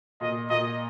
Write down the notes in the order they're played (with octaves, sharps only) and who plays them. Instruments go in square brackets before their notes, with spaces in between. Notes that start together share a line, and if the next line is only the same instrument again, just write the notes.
[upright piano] A#2 [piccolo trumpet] D#5
[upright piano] A#2 [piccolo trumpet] D#5